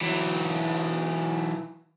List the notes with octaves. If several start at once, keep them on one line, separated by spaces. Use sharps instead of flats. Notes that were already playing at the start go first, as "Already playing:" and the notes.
E3 F#3